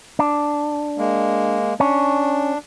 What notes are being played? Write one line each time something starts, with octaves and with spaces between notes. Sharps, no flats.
D4
G#3 A#3
C#4 D4